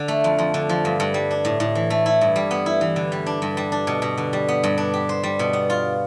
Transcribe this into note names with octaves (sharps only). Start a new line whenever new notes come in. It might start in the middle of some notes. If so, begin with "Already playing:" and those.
Already playing: D3
A3
F2
F2
D3
F3
G2
G2
G3
D4
A2
A2
E3
A3
E4
G2
G3
B3
E4
E3
D3
G3
D4
G2
G3
D4
B2
B2
D3
G3
B3
G2
D4
G4
C5
G3
B2
B3
F4